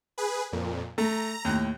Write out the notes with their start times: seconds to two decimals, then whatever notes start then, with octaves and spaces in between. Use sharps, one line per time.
0.18 G#4 B4
0.52 F2 A#2
0.98 A3 A#5
1.45 D#2 A2